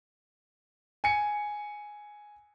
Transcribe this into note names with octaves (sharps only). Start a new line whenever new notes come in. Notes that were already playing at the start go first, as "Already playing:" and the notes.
G#5 C#7